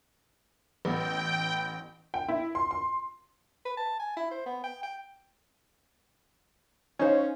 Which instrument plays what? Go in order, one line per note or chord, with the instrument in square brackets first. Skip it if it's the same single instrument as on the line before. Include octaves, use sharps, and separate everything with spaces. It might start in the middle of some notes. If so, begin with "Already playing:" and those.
[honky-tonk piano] A1 B3 [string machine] G5
[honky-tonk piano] G5
E4
C6
C6
[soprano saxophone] B4
A5
G#5
E4
C5
B3
G5
G5
[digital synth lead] C#4 [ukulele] D#4 C5 F5